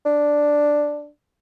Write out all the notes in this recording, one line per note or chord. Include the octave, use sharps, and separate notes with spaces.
D4